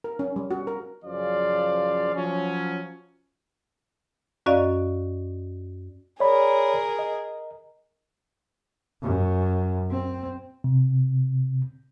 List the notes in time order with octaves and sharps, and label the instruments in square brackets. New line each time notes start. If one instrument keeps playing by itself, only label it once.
[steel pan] A#4
C#4
G3
F#4
A#4
[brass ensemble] F#2 C#3 F3 C5 D5 F5
F3 F#3 C#4
[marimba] F#2 C#4 F#4 D5 D#5 F5
[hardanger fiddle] G#4 A#4 [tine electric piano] C#5 D5 B5
[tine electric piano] D#5
[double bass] F#2
C4
[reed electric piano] C3